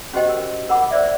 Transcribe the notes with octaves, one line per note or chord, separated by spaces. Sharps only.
C#4 F#4 G4 C5 D#5 G5
A#4
A#4 F#5 B5 D6
A#4 C5 D5 E5